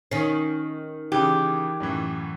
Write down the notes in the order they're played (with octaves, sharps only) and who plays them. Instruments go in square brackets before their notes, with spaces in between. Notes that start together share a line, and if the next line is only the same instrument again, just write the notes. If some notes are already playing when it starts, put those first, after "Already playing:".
[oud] D#3 C#4 [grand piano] C7
[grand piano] C#3 E3 [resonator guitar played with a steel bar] G4
[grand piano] F#2 A2 E3